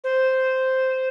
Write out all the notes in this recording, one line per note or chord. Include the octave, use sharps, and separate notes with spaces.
C5